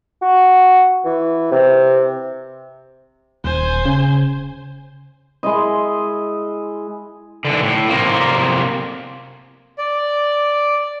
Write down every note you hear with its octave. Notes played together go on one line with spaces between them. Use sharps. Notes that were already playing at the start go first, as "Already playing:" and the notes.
F#4
E3
C3
D#1 C5 G#5
C#3
G#3 E4 D#5
D3 E3
A2
C3 A#3
D5